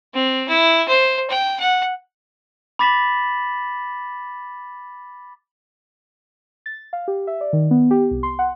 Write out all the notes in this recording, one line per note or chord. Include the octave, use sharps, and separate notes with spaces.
C4
E4
C5
G5
F#5
B5 D6 A6 B6 E7 F#7
A6
F5
G4
E5
D5
D#3
B3
G4
C2
C6
F#5